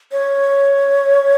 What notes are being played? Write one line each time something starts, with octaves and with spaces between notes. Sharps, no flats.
C#5